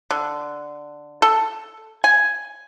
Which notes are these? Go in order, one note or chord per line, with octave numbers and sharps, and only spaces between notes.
D3
A4
G#5